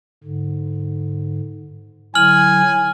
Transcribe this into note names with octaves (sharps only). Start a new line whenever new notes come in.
G#2 D3
D3 F#3 E4 G#5 F6 F#7